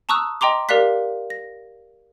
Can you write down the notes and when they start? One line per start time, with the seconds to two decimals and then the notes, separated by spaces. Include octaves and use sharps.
0.09 A5 A#5 C#6 D#6 E6 F#6
0.41 D#5 G5 A#5 C6 D6
0.69 G4 A#4 D5 F5 F#6 B6
1.30 A#6